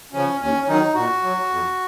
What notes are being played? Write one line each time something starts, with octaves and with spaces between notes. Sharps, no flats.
C#3 F3 C#4
D#2 C#4
C#4
D#3 F#3 D#4
A#2 F#4
F#3
F2